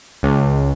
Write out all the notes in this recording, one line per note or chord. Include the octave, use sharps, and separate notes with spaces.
C#2